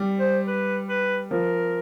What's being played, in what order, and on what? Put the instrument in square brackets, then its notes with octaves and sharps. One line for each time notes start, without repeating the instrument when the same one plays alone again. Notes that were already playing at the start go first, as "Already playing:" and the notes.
Already playing: [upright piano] G3
[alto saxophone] C5
B4
B4
[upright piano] F3 [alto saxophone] A#4